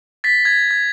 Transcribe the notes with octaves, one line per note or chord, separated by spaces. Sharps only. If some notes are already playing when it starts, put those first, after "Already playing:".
A6 B6
G#6
G#6